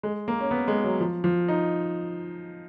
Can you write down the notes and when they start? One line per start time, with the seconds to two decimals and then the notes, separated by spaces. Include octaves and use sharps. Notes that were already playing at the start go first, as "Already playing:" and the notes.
0.03 G#3
0.28 A#3
0.40 C#4
0.51 B3
0.68 G#3
0.84 F#3
1.01 F3
1.24 F3
1.48 D#4